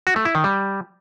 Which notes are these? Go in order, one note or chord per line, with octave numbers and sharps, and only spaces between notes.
F#4
A3
E4
D#3
G3